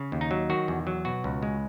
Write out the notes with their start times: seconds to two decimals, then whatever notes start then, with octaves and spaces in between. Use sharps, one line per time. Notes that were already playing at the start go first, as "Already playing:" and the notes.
Already playing: C#3
0.12 D#2
0.21 D#4
0.31 F#3
0.50 D#3 F#4
0.68 E2
0.87 F#3
1.05 B2 F#4
1.24 C#2
1.43 G#3